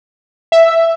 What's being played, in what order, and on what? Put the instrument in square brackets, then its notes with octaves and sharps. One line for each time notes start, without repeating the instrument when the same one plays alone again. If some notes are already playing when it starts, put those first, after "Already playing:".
[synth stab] E5